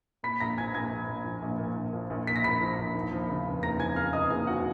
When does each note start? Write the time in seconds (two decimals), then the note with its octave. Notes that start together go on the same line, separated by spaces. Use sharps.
0.23 A#2 B5 B6
0.40 A#1 A#5 A#6
0.58 F3 G#5 G#6
0.74 A#1 G#5 G#6
0.91 A#2
1.09 A#1
1.26 F3
1.42 A#1
1.59 A#2
1.76 A#1
1.93 F3
2.10 A#1
2.27 A#2 B6
2.36 A#6
2.44 A#1 B5 B6
2.61 F3
2.78 A#1
2.95 D#2
3.11 F3
3.29 C#3
3.46 F1
3.63 D#2 A#5 A#6
3.79 F3 G#5 G#6
3.96 C#3 F5 F6
4.13 F1 D#5 D#6
4.30 D#2 G#4 G#5
4.47 F3 F#4 F#5